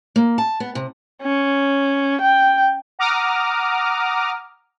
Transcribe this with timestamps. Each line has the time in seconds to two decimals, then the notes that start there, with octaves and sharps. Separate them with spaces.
0.16 A#3
0.38 A5
0.60 B3
0.75 C3
1.23 C#4
2.21 G5
2.99 F#5 A#5 D6 D#6 F6